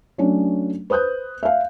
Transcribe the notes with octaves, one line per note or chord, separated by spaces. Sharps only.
F#3 A3 C#4 D4
B4 C5 D#6 F#6 G6
E5 F5